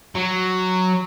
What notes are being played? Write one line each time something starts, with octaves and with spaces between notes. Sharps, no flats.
F#3